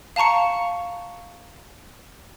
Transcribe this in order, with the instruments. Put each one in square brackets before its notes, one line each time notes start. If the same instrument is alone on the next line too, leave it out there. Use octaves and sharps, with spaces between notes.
[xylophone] F5 A5 A#5 C#6 C#7